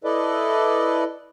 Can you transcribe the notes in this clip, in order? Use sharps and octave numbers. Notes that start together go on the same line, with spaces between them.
E4 A4 B4 D5 D#5